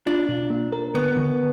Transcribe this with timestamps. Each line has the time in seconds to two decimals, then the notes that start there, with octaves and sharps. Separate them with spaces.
0.06 D4 F4
0.29 B2
0.50 A#3
0.72 A#4
0.94 D3 B3
1.17 D3